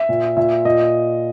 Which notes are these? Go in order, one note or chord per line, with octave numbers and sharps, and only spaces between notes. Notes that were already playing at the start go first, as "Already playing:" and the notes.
Already playing: E5
A#2
A#2 E5
A#2 D#5